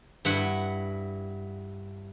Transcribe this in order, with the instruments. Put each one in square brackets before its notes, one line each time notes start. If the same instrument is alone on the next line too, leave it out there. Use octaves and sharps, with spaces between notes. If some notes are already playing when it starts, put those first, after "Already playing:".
[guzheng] G2 E4 F#5